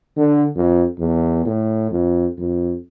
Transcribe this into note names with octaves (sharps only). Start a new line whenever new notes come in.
D3
F2
E2
A2
F2
F2